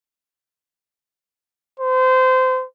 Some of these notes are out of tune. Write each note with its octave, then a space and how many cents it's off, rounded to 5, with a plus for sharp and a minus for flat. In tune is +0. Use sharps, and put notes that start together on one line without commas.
C5 -25